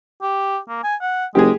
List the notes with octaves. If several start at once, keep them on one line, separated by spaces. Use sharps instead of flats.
G4
A#3
G#5
F#5
F#1 G#3 G4 G#4